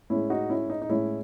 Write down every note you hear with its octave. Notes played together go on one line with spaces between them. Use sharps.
A2 G#3 C#4 E4
D#4 F#4
C#4 E4
D#4
D#4
A2 G#3 C#4 E4